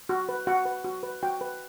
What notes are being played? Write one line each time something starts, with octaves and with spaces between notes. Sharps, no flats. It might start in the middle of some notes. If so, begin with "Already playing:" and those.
F#4
B4
F#4 F#5
B4
F#4
B4
F#4 G5
B4